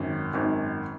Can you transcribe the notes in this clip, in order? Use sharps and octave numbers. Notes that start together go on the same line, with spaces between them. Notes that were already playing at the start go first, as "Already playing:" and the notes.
Already playing: G#1 F#2 D#3
G#1 F#2 D#3